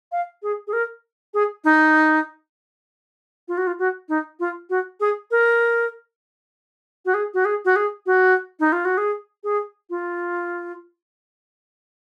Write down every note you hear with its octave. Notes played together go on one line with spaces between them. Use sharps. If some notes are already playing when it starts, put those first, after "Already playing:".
F5
G#4
G#4
A#4
G#4
D#4
F4
F#4
F4
F#4
D#4
F4
F#4
G#4
A#4
F#4
G#4
F#4
G#4
F#4
G#4
F#4
D#4
F4
F#4
G#4
G#4
F4